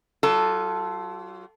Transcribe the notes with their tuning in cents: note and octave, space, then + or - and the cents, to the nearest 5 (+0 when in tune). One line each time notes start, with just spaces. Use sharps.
F#3 +40 F4 +0 A4 +0